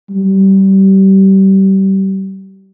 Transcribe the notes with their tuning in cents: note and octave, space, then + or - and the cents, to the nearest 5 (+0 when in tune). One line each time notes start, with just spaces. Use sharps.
G3 -25